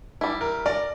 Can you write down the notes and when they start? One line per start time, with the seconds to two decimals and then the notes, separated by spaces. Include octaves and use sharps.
0.21 G3 E4
0.41 A#4
0.66 A#4 D5